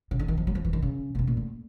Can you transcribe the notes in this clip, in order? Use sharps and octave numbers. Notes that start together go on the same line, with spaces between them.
C#3
D3
D#3
F3
F#3
F3
E3
D#3
C#3
A#2
B2
A#2
A2